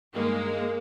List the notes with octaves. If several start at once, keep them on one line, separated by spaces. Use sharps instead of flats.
G2 D#3 G#3 A#3